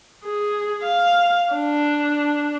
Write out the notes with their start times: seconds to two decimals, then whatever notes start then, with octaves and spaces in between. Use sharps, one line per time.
0.24 G#4
0.83 F5
1.53 D4